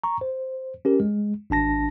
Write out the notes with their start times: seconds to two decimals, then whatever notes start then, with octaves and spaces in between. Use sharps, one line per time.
0.04 A#5 C#6
0.21 C5
0.85 C#4 G4 A#4
1.00 G#3
1.50 G#1 D4 A5 A#6